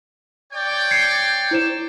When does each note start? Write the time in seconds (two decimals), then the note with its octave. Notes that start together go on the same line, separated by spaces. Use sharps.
0.53 C#5 D5 G5
0.91 G#6 C7 C#7
1.51 E4 C5 E7